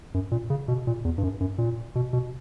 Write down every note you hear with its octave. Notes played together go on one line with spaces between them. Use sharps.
F#2
A#2
C#3
B2
A#2
E2
G2
F#2
F#2
A#2
B2
B2